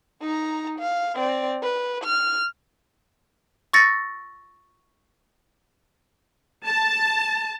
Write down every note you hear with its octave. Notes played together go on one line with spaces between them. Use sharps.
D#4 A#5
F5
C4 D5
B4
F6
C#6 E6 A6 A#6 C#7
A5